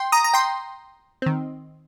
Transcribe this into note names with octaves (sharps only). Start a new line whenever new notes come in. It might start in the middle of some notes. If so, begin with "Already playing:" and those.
Already playing: G5 C6
A#5 D#6
A#5
G5 C6
D#3 C4